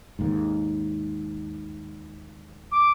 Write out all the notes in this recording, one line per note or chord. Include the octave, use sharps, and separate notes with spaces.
D#2 G#2
D6